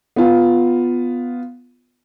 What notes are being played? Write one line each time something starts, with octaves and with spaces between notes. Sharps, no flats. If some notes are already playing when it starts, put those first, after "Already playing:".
B3 F4